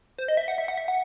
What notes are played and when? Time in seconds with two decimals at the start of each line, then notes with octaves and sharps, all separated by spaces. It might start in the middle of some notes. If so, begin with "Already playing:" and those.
0.18 C5
0.28 D#5
0.37 E5
0.48 F#5
0.58 E5
0.68 F#5
0.77 E5
0.88 F#5